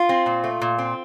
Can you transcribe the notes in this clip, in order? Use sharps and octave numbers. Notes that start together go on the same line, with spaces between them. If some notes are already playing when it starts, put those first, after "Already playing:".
Already playing: F4
C4
A#2
A3
A#2
C4